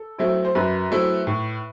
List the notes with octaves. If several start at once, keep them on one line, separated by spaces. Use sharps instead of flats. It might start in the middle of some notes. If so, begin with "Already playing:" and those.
Already playing: A4
F#3 A3 C4 E4
C5
F#2 B4
F#3 A3 C4 E4
A2